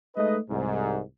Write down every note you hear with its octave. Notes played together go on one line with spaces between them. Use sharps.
G#3 A3 D#4 B4 D#5
C2 G#2